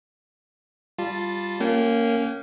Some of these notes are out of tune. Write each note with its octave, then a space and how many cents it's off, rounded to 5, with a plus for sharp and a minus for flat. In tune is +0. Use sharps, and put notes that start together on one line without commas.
G3 +0 F4 +0 A5 +0
A#3 -15 C#4 +0 G5 -45